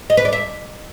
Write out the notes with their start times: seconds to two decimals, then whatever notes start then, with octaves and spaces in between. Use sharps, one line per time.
0.10 D#5
0.17 B4
0.25 D5
0.33 E5